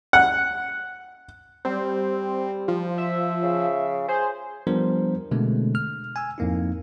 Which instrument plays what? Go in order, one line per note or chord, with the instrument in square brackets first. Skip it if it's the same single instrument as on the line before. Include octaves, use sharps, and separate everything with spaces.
[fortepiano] F#5
[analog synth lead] G3 [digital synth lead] C4
[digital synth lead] F3
[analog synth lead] E5
[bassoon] C#3
[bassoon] G#4 [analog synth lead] C5
[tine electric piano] F3 G3 B3 D4 A#4 C5
B2 D3 G#3 A3 B3 C4
F6
G#5 E6
F2 G#2 A#3 D#4 E4